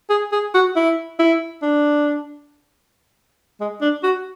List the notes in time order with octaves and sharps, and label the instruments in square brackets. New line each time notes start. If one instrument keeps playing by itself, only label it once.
[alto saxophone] G#4
G#4
F#4
E4
E4
D4
G#3
D4
F#4